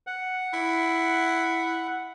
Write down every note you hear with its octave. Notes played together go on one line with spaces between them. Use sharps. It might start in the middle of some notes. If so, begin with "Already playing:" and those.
F#5
E4